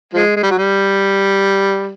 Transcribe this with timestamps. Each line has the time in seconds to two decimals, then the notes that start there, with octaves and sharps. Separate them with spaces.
0.14 F3 G#3
0.36 G#3
0.43 G3
0.51 F#3
0.58 G3